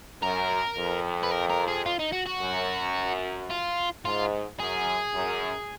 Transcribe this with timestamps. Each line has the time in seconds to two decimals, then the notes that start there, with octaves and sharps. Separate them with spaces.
0.22 F#2 A#4
0.77 F2
1.23 B4
1.31 A#4
1.50 A#4
1.68 G#4
1.86 F4
1.99 D#4
2.13 F#4
2.26 F#4
2.41 F#2
3.50 F4
4.05 G#2 F4
4.59 F#2 G#4
5.14 F#2